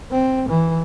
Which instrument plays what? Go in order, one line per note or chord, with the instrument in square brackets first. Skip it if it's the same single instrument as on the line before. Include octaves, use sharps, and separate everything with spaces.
[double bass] C4
E3